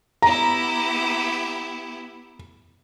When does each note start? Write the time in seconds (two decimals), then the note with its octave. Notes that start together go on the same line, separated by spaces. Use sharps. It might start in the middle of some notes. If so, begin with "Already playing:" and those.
0.22 B3 E4 G4 A#5